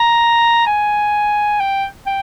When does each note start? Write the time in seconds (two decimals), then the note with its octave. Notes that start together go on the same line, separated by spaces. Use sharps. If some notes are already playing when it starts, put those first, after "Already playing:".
Already playing: A#5
0.66 G#5
1.60 G5
2.07 G5